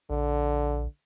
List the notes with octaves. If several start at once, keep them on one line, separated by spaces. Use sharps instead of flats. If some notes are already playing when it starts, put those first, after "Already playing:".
A#1 D3